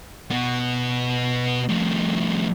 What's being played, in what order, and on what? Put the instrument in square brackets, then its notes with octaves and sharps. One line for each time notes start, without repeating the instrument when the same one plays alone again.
[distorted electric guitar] B2 B3
F2 A2